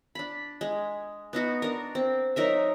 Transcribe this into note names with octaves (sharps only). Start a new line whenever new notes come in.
D4 B5
G#3
B3 D#4 F#4
D4 A#4
C4
F#3 D#4 A#4 E5